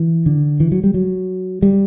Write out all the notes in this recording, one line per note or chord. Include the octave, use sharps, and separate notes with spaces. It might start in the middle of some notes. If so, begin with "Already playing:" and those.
Already playing: E3
D3
E3
F#3
G3
F#3
G3